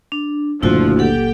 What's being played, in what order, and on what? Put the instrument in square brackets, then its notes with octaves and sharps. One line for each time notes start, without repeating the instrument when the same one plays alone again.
[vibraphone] D4
[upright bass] F#1 A#2 [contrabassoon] D2 [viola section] F3 [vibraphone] E4 F#4
[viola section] G4 G5 [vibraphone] A4 F#5